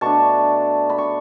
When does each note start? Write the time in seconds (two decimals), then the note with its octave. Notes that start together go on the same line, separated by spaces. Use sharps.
0.01 B2 A3 D4 A5 C#6
0.90 B5
0.98 C#6